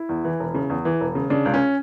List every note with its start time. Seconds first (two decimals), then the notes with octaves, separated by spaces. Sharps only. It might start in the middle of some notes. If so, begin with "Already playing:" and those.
Already playing: E4
0.09 E2
0.24 E3
0.40 E1
0.54 C#3
0.70 E2
0.85 E3
1.01 E1
1.15 C#3
1.30 C#3 D4
1.45 C#2
1.54 C#4